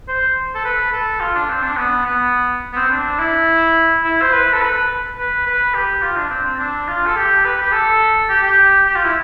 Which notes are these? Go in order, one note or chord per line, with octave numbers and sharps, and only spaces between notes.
C5
A4
B4
A4
F4
D4
C4
D4
B3
B3
B3
C4
D4
E4
E4
C5
B4
A4
B4
B4
B4
G4
F4
D4
C4
C4
D4
F4
A4
G4
B4
G4
A4
G4
G4
G4
F4
E4